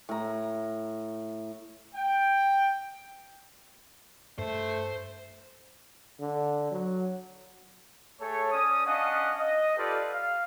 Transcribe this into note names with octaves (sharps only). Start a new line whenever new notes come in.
A2 A#5
G5
G2 A3 C5
D3
F#3
A3 G#4 A4 C#5
C#4 D5 D#6
C#4 D4 D#5 F5 F#5
D#5
F4 G4 A4 B4 D5
F5